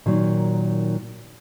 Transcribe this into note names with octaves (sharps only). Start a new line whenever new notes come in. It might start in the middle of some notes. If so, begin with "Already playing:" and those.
A#2 D#3 F#3